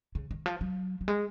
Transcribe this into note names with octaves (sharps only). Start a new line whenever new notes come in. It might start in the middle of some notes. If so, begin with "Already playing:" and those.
C#3
D#3
F3
F#3
F#3
G#3